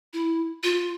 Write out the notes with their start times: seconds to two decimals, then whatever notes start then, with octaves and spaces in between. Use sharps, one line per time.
0.13 E4
0.63 F4